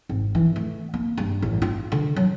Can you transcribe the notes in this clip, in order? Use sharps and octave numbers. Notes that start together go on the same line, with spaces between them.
G#1
E3
A3
A#3
G2
A1
F4
D3
F#3